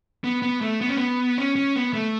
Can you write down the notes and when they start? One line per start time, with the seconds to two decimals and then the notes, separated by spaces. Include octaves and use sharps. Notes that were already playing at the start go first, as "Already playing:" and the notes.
0.24 B3
0.42 B3
0.61 A3
0.81 B3
0.88 C#4
0.97 B3
1.38 C#4
1.56 C#4
1.76 B3
1.94 A3